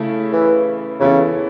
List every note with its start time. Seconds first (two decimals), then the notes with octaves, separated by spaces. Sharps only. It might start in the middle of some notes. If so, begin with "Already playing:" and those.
Already playing: C#3 A3 E4
0.32 E3
1.00 C#3 E3 B3 E4 A4